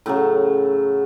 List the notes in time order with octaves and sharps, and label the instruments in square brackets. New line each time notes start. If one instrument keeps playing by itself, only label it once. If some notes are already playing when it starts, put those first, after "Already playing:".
[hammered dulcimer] A2 C#3 F#3